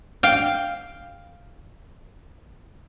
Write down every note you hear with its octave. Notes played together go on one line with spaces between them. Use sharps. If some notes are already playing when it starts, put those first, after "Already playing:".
F5 G5